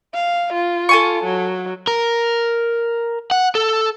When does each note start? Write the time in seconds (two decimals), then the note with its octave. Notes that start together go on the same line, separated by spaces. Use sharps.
0.14 F5
0.54 F4
0.89 A4 G#5 C#6
1.24 F#3
1.87 A#4
3.31 F#5
3.55 A4